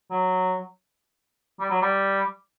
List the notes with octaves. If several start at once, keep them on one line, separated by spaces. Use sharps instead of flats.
F#3
G3
F#3
G3